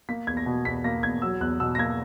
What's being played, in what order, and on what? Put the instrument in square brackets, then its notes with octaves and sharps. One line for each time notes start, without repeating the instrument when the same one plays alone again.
[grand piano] A#3 B6
E2 G#6
A#6
B2
E2 B6
A#3 A#6
E2 G#6
F#3 E6
E2 F#6
B2 E6
A#6
A#3 G#6